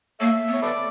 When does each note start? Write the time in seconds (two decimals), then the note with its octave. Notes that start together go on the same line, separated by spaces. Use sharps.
0.21 A#3 A4 C#5 E5
0.48 B3
0.53 C#5
0.62 A4 B4 D5